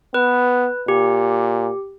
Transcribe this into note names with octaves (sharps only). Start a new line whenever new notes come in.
B3 B4
A#2 G4